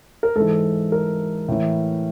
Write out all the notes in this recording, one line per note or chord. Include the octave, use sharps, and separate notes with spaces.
A#4
G#2 E3 A4
A#4
A2 E3